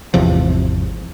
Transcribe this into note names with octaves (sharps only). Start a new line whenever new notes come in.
G#1 E2 C3 F3